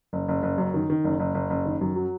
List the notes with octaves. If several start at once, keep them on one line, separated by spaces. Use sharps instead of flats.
F#1
F#1
F#1
F#2
D#3
D#3
F#1
F#1
F#1
F#1
D#3
F#2
F#3